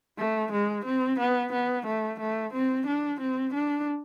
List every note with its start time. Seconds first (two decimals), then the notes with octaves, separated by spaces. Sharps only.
0.18 A3
0.52 G#3
0.85 C4
1.19 B3
1.53 B3
1.86 A3
2.20 A3
2.53 C4
2.87 D4
3.20 C4
3.54 D4